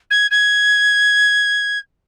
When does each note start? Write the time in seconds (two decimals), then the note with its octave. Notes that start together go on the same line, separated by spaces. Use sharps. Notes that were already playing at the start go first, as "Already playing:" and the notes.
0.10 G#6
0.31 G#6